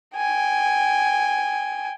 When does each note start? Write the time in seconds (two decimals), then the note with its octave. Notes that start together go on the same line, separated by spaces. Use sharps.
0.16 G5 G#5